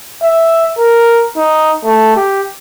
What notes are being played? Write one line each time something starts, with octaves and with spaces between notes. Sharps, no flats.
E5
A#4
D#4
A3
G4